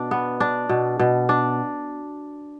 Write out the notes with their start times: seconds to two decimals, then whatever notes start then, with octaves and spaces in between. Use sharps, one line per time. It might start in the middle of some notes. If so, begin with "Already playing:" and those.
Already playing: B2 D4
0.11 B3
0.40 D4
0.69 B2
0.99 B2
1.29 D4